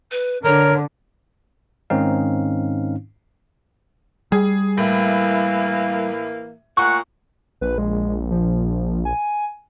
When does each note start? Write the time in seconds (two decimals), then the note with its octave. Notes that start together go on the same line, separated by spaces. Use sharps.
0.11 B4
0.44 D3 A#4 C#5
1.90 G#2 D#3 C4 C#4 D#4 F5
4.32 G3 G#4
4.77 A2 E3 A#3
6.77 A#2 F#5 C#6
7.61 A#1 B4
7.78 G#3
8.31 F3
9.05 G#5